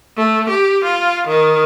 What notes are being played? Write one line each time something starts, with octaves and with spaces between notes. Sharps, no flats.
A3
G4
F4
D#3